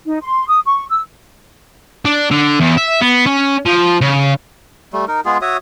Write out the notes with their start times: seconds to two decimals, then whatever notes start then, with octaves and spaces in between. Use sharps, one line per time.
0.06 D#4
0.22 C6
0.48 D#6
0.66 C#6
0.89 E6
2.05 D4
2.31 D3
2.61 E2
2.78 E5
3.02 B3
3.26 C#4
3.66 F3
4.01 C#3
4.93 G3 A3
5.08 D#4 A#4
5.25 G#3 B3 F4 G#4
5.42 F#4 C#5 E5 D#6